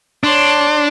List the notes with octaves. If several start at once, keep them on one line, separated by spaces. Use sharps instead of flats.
D4 C#5 C6